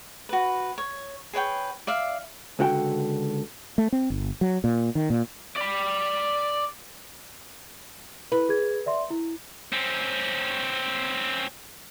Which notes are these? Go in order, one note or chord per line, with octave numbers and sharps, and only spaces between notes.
F#4 B4
C#5
G#4 B4 C#5 G5
D5 E5 F5
C#2 D3 F#4 G5
A3
C4
G1
F#3
A#2
D#3
A#2
D5 B5
E4 B4
G#4 G#6
D5 E5 C6
E4
C4 C#4